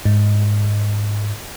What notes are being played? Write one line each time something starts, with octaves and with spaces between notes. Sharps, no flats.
G#2